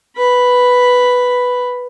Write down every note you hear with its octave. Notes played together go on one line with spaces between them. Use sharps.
B4 B5